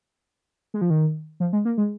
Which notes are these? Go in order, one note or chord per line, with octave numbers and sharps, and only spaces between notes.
G#3
F3
D#3
F3
G#3
A#3
G#3